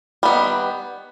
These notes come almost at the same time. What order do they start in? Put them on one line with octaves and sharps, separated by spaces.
G3 B3 D#3